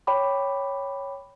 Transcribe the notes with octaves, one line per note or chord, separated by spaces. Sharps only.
C#5 G5 B5 D6